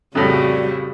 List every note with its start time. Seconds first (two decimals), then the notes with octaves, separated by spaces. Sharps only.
0.15 F2 A2 C#3 G3 F#4